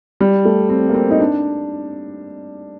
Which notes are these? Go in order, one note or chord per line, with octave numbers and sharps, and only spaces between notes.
G3
A3
C4
A#3
C4
D#4
D4